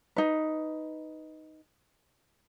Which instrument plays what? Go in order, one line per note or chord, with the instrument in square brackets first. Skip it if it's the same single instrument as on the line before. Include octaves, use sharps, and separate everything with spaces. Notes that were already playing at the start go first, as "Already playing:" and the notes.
[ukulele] D#4 B4